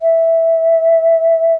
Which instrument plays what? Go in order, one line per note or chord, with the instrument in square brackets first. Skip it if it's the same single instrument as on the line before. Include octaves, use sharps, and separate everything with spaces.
[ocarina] E5